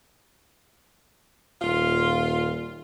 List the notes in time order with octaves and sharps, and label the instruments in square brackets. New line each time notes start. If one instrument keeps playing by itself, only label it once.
[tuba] D#1 [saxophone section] F4